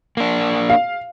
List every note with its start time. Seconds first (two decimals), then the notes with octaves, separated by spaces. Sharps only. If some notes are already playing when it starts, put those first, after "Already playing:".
0.17 A#3 D4
0.69 F5